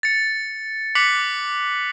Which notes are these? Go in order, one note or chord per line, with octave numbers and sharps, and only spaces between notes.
A6 C#7
D6 F#6 B6 C#7 F#7